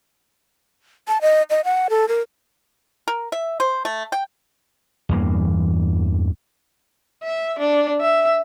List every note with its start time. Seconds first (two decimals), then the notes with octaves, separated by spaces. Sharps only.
1.08 A5
1.22 D#5
1.50 D#5
1.65 F#5
1.90 A4
2.08 A#4
3.08 A#4
3.32 E5
3.60 C5
3.85 A3
4.12 G5
5.09 E2 G2 E3 A#3
7.23 E5
7.59 D4
8.01 E5